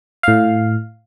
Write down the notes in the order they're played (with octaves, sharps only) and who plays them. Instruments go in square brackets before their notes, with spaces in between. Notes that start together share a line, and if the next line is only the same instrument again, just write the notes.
[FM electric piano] A2 F5